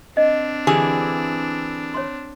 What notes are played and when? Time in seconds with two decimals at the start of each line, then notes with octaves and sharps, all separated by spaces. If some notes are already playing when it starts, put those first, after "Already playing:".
0.17 C4 D4 D#5
0.67 D3 E3 G4 G#4
1.94 C#5 C6